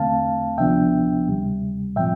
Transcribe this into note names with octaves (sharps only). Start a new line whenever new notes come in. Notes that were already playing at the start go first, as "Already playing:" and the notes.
Already playing: E2 D3 A3 C4 F5 A5
D2 C3 F3 B3 D4 E5 G5
D2 C3 G3
A2 F3 C4 E5 G5